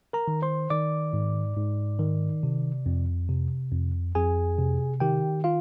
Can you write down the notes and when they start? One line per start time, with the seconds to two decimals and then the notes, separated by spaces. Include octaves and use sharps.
0.13 A#4 A#5
0.28 D#3
0.42 C5 C6
0.70 D#3 D5 D6
1.13 G#2
1.57 G#2
1.99 D#3
2.43 C3
2.86 F2
3.29 C3
3.72 F2
4.15 F2 G#4 G#5
4.58 C3
5.00 D#3 G4 G5
5.44 F4 F5